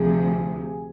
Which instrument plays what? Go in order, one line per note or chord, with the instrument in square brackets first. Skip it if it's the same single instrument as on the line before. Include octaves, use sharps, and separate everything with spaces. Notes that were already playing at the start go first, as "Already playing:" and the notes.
Already playing: [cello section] D2 C3 F3 [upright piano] G#4